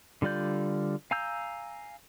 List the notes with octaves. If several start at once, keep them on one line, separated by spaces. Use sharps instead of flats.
D3 G3 F4 D5 G6
F5 G#5 A#5 E6 G6